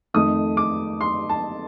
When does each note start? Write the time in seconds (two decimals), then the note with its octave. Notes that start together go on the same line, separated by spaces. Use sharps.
0.14 F2 D#3 A3 D#6
0.57 D6
1.01 C6
1.29 A5